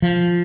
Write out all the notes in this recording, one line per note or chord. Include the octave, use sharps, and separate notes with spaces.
F3